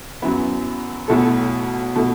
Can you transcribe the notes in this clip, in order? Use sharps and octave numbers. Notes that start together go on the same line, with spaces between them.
F#2 F#3 B3 E4
B1 B2 A3 E4 A4
B2 A3 E4 A4